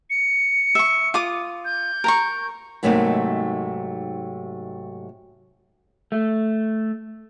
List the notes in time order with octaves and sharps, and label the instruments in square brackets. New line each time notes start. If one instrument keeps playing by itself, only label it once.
[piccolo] C#7
[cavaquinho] E5 C#6
F4 D6 D#6
[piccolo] G6
[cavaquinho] A#4 A#5 C#6
[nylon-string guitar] G#2 C3 F#3 A3 A#3 D#4
[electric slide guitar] A3